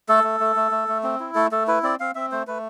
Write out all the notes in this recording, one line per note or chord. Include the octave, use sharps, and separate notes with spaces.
A3 A4
A3
A3
A3
A3
A3
C4
E4
A3 A4
A3 A4
E4 B4
C4 D5
C4 F5
C4 E5
A3 C5
A3 B4